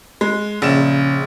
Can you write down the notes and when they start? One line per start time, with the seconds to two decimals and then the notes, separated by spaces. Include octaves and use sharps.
0.21 G#3
0.62 A#1 C#3 E7